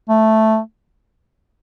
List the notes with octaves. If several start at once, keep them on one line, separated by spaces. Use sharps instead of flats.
A3